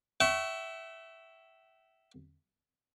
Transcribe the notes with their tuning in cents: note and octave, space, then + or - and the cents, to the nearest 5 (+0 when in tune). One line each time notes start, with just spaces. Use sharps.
E5 +0 G5 -45 C#6 +0